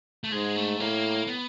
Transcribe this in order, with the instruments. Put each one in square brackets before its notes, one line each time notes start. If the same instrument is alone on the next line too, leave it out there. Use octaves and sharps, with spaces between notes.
[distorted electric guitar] A3
[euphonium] G#2 [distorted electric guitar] G#3
[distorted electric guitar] A3
[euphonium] A2 [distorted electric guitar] A#3
[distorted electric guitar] B3